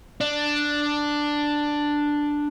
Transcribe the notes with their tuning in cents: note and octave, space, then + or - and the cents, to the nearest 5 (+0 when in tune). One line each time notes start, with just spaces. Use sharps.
D4 +5